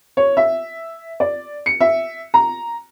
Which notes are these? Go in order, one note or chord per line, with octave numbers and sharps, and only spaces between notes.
C#5
E5
D5
C#7
E5
A#5